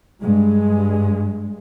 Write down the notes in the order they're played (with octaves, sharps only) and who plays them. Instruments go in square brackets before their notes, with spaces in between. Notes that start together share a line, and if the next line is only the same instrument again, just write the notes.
[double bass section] G2 G#3